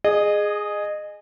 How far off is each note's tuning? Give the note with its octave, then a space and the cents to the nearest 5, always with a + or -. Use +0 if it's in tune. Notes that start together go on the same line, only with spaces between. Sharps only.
G#4 +0 D#5 -25